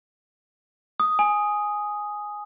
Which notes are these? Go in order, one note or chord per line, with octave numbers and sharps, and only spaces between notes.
D#6
G#5